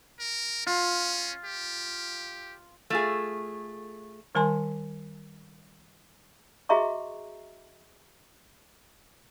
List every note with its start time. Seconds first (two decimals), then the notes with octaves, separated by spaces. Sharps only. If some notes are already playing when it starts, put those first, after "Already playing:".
0.19 A#4
0.67 C#4 F4
1.44 G4
2.90 A3 F4 G#4
4.35 D#3 G3 A#4 G#5 A5 C6
6.69 F#4 G#4 D#5 E5 A#5 C#6